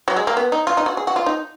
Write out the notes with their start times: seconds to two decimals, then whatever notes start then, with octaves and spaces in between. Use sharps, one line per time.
0.08 F#3
0.16 G#3
0.27 A#3
0.37 B3
0.52 D#4
0.67 F4
0.77 D#4
0.86 F#4
0.97 G#4
1.07 F#4
1.16 F4
1.26 D#4